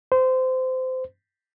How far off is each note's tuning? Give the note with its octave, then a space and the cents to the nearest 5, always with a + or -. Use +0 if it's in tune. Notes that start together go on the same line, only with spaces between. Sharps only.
C5 -20